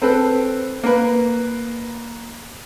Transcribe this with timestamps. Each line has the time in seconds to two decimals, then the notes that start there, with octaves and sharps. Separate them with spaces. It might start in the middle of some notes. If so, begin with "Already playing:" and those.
0.02 C4 A4 B4
0.84 A#3 B4